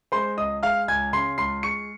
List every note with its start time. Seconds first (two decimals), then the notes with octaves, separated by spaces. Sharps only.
0.12 G#3 C5 C6
0.37 C#2 D#5 D#6
0.63 G#3 F5 F6
0.88 C#2 G#5 G#6
1.13 C#3 C6 C7
1.38 C#2 C6 C7
1.63 G#3 C#6 C#7